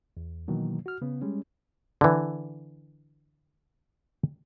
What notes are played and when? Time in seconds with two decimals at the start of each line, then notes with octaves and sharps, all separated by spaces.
0.17 E2
0.48 B2 D#3 E3 F#3 A#3
0.86 F#4 F6
1.02 C#3 B3
1.22 G3 G#3 C#4
2.01 D3 E3